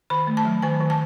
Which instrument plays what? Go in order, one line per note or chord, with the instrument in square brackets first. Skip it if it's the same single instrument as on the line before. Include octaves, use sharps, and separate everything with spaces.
[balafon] D#3 B5
A3
A5
F#3
D#3 G#5
D#3
A5